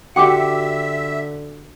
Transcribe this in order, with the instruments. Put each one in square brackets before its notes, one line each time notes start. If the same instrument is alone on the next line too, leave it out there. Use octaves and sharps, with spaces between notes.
[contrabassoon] D3 [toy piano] F#4 G5 D6 [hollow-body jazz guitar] G4 F#5 [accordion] E5